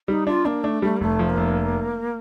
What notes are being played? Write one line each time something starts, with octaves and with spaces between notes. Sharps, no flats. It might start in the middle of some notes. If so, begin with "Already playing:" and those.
G3 D#4
D4 F4
A#3 D4
A3 D4
G3 A3
A#3
F1 A3
F3
A#3
F1